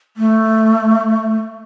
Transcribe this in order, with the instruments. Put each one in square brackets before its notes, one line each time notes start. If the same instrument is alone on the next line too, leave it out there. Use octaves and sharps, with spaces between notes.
[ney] A3